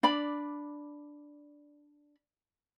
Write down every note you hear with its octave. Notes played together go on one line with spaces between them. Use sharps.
D4 D5 B5